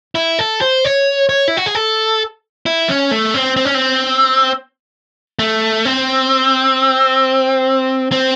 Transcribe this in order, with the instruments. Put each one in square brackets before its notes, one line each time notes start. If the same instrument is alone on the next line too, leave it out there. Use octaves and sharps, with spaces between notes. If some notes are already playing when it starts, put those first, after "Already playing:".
[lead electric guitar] E4
A4
C5
C#5
C#5
E4
F#4
G#4
A4
E4
C#4
A3
C4
C4
C#4
C4
A3
C4
C4